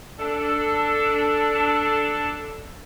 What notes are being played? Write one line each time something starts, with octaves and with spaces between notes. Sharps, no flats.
D4 A4